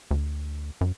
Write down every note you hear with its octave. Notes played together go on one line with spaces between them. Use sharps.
D2
F#2